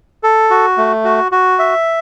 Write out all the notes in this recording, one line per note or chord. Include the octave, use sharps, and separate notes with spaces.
A4
F#4
A3
F#4
F#4
E5